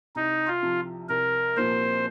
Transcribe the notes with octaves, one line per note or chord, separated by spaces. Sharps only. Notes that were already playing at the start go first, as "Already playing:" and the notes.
C2 D#4
F4
C3 F3
C2 A#4
A#2 F3 A#3 C5